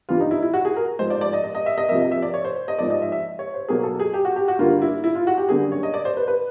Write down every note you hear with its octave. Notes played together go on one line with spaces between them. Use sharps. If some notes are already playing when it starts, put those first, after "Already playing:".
G2 E3 G3 F4
D#4
E4
E4
F#4
G#4
A#4
G#2 F3 G#3 C5
D5
D5
D#5
D#5
D#5
E5
D#5
C3 F3 A#3 E5
D#5
E5
D5
C#5
C5
D#5
G#2 F3 A#3 D5
D#5
E5
E5
C#5
C5
B2 F#3 A#3 G#4
A4
G#4
G4
F#4
G4
F#4
G2 D3 G3 A#3 F4
E4
E4
F4
F#4
G4
F#2 D3 G3 A#3 G#4
C#5
D#5
D5
C5
B4
B4